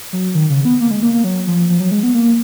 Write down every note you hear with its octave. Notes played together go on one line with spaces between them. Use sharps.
F#3
D#3
C#3
B3
A#3
G#3
A#3
A#3
F#3
F3
F3
F#3
G#3
B3
A#3